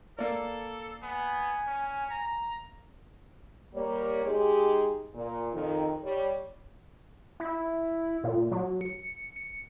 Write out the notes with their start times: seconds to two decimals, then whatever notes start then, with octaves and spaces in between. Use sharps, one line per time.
0.19 A#3 A4 D5
1.02 B3 G#5
1.67 C#4
2.11 A#5
3.75 G3 A#3 C#5
4.25 G#3 D#4 G4 G#4
5.15 A#2
5.53 F2 D#3
6.04 G3 C#5
7.40 E4
8.24 A#2
8.51 F#3
8.81 C#7
9.36 C#7